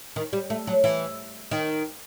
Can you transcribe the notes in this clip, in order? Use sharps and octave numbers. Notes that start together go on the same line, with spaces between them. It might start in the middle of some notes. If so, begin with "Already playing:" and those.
D#3
G3
A3
F#3
E3
D#3